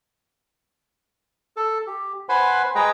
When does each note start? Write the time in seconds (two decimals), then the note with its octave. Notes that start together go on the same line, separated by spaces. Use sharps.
1.57 A4
1.87 G4
2.29 B4 C5 F#5 G#5 B5 C6
2.75 G#3 G#4 B4 G5 A#5